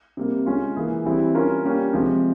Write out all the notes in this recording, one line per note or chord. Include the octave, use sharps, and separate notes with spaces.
C3 G3 A#3
G#3 C#4 F4
E3 A#3 E4 G#4
E3 G3 C4 E4
G3 C#4 F4 A#4
G3 A#3 C#4 G4
C3 F3 G#3